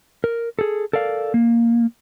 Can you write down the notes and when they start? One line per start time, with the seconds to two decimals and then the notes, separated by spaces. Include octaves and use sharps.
0.24 A#4
0.59 G#4 A4
0.93 A4 A#4 D5 F5
1.34 A#3